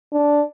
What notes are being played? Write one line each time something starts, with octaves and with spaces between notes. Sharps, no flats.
D4